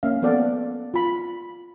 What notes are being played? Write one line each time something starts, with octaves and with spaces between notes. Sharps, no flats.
A#3 C#4 E5 F5
B3 C4 A4 D5 F5 F#5
F4 B5